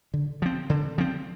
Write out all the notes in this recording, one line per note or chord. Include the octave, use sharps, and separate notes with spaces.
D3
F3 C4
D3
F3 C4